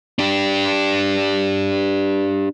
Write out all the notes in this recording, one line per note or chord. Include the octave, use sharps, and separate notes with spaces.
D4 G4